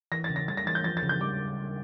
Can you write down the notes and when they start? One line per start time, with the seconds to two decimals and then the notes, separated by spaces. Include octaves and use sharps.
0.12 E3 A#6
0.24 A6
0.30 C#3
0.36 A#6
0.48 G3 A6
0.57 A#6
0.67 E3 A6
0.75 G6
0.84 F3 A6
0.97 A6
1.03 C#3
1.09 G6
1.21 G3 D6